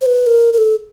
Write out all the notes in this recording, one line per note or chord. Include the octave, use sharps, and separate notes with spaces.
C5
B4
A#4
A#4
A4